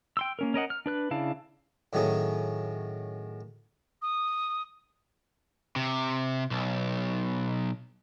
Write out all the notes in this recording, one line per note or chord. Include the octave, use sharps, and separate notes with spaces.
G5 C6 E6
A#3 C#4 A#4
C#4 A#4 D#5 F#5
F6
D4 B4 F#6
C#3 D4 E4 F5 A5
A2 D#3 F#3 A3 C#4 G#4
D#6
C3
B1